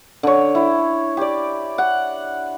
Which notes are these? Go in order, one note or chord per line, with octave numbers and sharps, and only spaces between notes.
D3 C#5
E4
G4 D5
F#5